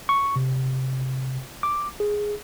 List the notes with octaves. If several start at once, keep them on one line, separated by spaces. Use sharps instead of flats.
C#6
C3
D6
G#4